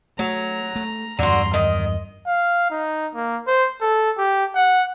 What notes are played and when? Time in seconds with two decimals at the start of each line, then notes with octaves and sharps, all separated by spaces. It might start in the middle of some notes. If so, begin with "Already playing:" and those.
0.19 F#3 A3 A#5
0.76 A3
1.19 E2 G2 D3 F#4 A#5 C6
1.54 D#3 D#5
2.27 F5
2.71 D#4
3.15 A#3
3.47 C5
3.81 A4
4.18 G4
4.56 F#5